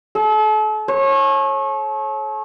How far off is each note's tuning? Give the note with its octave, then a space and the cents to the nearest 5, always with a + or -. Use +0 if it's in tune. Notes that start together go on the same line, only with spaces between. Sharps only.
A4 -40
C#5 -30